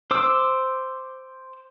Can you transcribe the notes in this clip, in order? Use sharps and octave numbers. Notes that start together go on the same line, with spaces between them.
C5 D6 E6